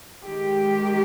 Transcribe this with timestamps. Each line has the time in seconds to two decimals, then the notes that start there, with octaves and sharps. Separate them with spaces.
0.24 D#3 G#3 G4